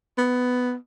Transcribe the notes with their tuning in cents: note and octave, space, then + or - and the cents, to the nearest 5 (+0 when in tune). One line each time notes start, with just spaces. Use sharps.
B3 +10